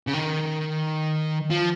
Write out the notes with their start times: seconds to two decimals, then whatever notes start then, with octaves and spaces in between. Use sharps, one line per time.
0.07 C#3
0.14 D#3
1.51 F3